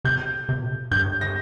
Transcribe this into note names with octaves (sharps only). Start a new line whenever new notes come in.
C3 G6
C3
A#2
C3
G2 G6
A#6